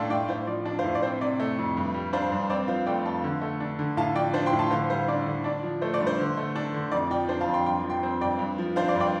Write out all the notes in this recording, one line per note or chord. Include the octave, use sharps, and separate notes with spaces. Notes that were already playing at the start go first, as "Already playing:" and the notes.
Already playing: A2 A3 D4 D5 F5 G5 A5 C6
A2 D5 G5
A2 C5 F5
F3 D5
D4 D5
C5 F5
A2
D5
C4 C5
C3 D5
A3
F2
G2
G3
D4 C5 F5
G2
C4 D5
F3 C5 F5
A3 D5 G5
F2 F5 A5
D3
A3
D4
D3
A2 F5 A5
F3 D5 G5
D4 C5 F5
G5 C6
A2
F5 A5
D3 C5 F5
G3 C5 F5
D4 D5
D3
D4 D5
F3
A3 C5
D5
G2
C5
D3
A3
D4
D3
F2 D5
F3 D5 G5
D4 C5
F5 A5
F2
G5 C6
G2 G5 C6
F3
G5 C6
C4
G2 D5 G5
G2
F3
D4 C5 F5
D5
G2
D5 G5